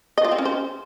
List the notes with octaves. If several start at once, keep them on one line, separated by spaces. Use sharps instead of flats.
D#5
F4
C4
C#4
C5